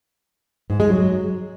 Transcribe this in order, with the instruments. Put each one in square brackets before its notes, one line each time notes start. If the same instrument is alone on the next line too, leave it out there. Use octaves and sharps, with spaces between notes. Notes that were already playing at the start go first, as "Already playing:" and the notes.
[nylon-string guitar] G#2
G#3
F#3